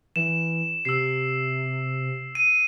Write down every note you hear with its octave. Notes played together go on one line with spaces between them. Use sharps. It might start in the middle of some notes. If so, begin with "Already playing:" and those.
E3 E7
C3 E6 C7
D#7